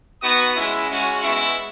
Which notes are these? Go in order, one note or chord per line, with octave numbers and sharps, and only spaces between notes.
B3 D#4 F#4 D#6
G#3 C#4 E4
G#3 C#4 F#4
G#3 B3 E4 C#6